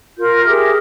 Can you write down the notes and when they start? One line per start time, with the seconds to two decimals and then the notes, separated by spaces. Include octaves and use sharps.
0.18 F4 A#4 G6
0.45 G4 G#4 A#4 E5